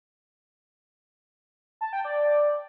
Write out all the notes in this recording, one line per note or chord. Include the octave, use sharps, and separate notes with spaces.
A5
G5
D5